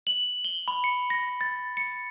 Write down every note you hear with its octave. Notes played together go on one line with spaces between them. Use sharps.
F#7
G7
B5
C#7
A#6
A6
C#7